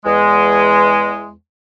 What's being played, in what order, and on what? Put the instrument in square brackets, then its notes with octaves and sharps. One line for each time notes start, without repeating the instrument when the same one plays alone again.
[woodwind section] E2 G#3